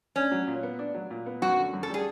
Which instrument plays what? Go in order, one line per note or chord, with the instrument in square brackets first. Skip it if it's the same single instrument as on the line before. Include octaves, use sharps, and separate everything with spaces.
[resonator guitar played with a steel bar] C#4 [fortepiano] D4
[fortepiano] F#3
A#2
B3
D4
F#3
A#2
B3
[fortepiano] F#2 [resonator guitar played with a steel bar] F#4
[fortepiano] D3
F#2
[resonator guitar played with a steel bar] A4
[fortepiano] G3 [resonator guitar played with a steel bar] G#4